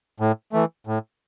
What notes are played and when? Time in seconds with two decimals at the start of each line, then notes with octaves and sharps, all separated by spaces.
0.20 A2
0.52 E3 A3
0.87 A2